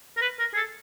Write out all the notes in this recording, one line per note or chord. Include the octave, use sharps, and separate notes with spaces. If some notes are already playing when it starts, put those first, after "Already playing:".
A#4
B4
A#4
G#4
A4